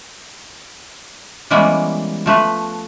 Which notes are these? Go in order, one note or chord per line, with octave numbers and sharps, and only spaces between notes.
E3 G3 G#3 A#3 B3 C#4
F3 A3 B4